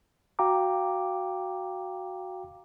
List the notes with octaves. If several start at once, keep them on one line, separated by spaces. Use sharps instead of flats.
F#4 F5 G5 A#5 D6